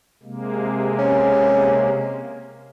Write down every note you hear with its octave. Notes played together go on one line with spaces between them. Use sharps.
C3 G#3 A#3
C#4